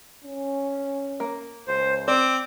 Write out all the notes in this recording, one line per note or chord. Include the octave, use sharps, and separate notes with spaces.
C#4
A#3
C#2 C5
C4 D5 D6